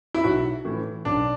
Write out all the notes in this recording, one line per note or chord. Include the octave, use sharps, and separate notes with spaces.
E4
B1 F#4
A2 E3
B1 D4